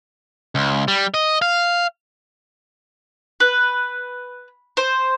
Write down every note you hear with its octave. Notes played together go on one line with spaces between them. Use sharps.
C#2
G3
D#5
F5
B4
C5